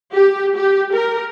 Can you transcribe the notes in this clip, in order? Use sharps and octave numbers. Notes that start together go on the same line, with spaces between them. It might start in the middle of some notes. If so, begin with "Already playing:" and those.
G4
G4
A#4